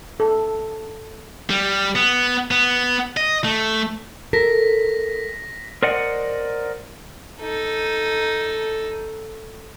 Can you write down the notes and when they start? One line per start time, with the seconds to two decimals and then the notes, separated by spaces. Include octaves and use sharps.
0.20 A4
1.50 G3
1.95 B3
2.51 B3
3.17 D#5
3.44 A3
4.33 A4 A#4 A#6 B6
5.83 A#4 C5 D5 D#5 F#5
7.41 D#4 A4